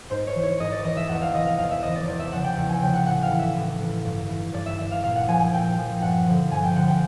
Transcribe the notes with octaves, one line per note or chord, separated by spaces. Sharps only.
G#2 C5
C#5
E3
C#5
G#2 D#5
D5
E3 D#5
E5
E2 F#5
F5
C3 E3 D#5
F5
E2 F5
E5
C3 E3 D#5
D5
E2 D5
E5
C#3 F3 F#5
G5
E2 F#5
G#5
C#3 F3 G5
F#5
A2 F#5
F5
E3
E5
A2
E3
G2
E3
G2 D5
E5
E3 E5
F5
A#2 F5
F#5
F3 G#5
G#5
A#2 G5
F3
G2 F#5
D3 F3
G2 G#5
G5
D3 F3 F#5
G5